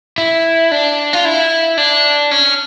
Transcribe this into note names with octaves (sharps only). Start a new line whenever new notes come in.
E4
D4
F4
E4
D4
C#4